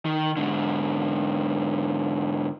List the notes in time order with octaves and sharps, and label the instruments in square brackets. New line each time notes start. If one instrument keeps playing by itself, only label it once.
[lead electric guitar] D#3
G#2 D3